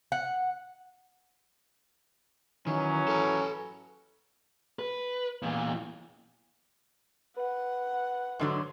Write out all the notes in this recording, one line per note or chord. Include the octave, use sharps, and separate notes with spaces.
F#5
D#3 E3 F#3 C#4
A4 B4
B4
E2 A#2
B4 F#5
G#2 D3 F#3